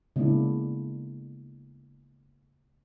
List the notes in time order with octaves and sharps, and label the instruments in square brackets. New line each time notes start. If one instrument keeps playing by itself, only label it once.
[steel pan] C#3 G#3 A#3 B3 D4 E4